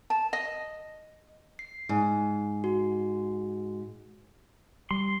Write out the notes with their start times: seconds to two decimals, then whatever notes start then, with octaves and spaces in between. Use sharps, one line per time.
0.10 A5
0.33 D#5
1.59 C7
1.89 G#2
2.64 F#4
4.91 G3 C6